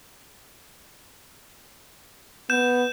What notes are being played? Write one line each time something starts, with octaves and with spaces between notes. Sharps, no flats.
B3 G6 E7